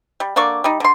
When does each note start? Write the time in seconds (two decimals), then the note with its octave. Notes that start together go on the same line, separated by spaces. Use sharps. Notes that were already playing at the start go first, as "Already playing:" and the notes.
0.20 G3
0.36 D3 A#3 D5 C#6
0.64 G3 D#4
0.80 D3 C6